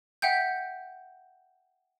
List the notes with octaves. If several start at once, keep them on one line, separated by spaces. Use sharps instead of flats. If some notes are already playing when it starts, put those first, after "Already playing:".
E5 F#5 G5 G6